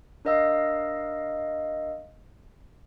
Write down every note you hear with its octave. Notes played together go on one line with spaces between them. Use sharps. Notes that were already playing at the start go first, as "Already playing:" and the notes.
D4 A#4 D#5 F5 E6